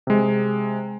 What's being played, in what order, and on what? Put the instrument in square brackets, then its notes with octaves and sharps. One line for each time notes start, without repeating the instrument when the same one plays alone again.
[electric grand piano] C3 G#3